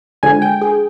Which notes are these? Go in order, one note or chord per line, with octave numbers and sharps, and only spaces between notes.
D3 F3 G#3 G#5
G5
G#4